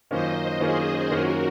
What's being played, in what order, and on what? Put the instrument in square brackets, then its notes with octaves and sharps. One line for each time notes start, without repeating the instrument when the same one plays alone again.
[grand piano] F#2 D#3 A#3 C#4 F4 [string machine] C5 D#5
[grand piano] F#2 D#3 A#3 C#4 F4 [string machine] G#4 C5
[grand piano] F#2 D#3 A#3 C#4 F4 [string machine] F#4 A#4